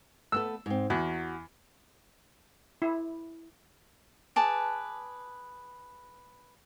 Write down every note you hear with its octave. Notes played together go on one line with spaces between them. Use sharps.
A3 B3 A4 E6
G#2 C4
E2 F#4
E4
G#4 B4 A5 D6